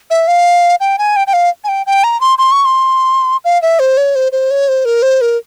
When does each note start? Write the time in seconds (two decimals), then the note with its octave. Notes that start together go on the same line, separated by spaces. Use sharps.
0.10 E5
0.28 F5
0.80 G5
0.98 G#5
1.16 G5
1.27 G5
1.33 F5
1.64 G#5
1.68 G5
1.86 G5
2.04 A#5
2.21 C6
2.38 C6
2.52 C#6
2.65 C6
3.45 F5
3.62 E5
3.79 C5
3.97 C#5
4.15 C5
4.32 C5
4.51 C#5
4.68 C5
4.85 A#4
5.02 C5
5.21 A#4